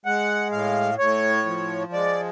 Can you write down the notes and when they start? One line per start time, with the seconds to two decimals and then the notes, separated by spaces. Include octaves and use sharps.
0.06 G#3 F#5
0.52 A2 F5
0.99 A2 C#5
1.45 F3
1.93 G#3 D5